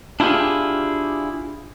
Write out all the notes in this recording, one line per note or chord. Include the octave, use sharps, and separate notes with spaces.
D4 E4 F4 G4 G#4